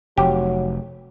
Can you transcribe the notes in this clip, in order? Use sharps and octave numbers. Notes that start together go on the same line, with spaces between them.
F1 F#3 G4